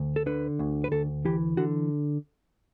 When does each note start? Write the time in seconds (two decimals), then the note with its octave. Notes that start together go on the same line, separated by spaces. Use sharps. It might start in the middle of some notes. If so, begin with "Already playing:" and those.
Already playing: D2
0.16 A4
0.26 D3 B4
0.59 D2
0.84 B4
0.92 D2 A4
1.25 E3 G4
1.57 D3 F#4